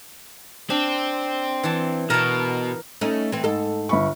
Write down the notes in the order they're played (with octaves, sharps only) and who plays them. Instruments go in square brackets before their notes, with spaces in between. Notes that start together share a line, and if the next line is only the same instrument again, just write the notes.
[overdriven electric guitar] C4 [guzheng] D4
[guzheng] E3 A5
[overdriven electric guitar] B2 [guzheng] A#4 A5
[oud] A3 C#4 D#4
E3 C4
G#2 A4
[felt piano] G1 B5 C#6